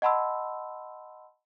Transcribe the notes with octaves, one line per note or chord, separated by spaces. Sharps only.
D#5 F#5 A5 B5 C6 E6